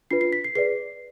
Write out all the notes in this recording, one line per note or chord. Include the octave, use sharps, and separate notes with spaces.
D4 F4 B4 C7
C7
B6
C7
G#4 B4 D5 C7